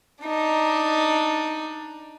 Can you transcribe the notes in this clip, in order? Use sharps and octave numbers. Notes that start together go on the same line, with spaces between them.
D4 D#4